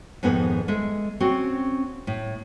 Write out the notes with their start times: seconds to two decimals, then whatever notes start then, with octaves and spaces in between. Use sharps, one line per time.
0.23 F2 G#2 D#3 B3 G#5
0.68 G#3 A4 E5
1.20 C4 C#4 F#4
2.07 A2